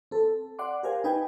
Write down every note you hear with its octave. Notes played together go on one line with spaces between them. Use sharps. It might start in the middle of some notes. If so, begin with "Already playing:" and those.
C4 A4
D5 F#5 C6 D6
G4 A#4 C5 F5 G#5
D#4 B4 G5 G#5